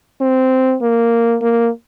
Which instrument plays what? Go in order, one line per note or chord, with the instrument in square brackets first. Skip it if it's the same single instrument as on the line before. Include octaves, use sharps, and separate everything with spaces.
[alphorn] C4
A#3
A#3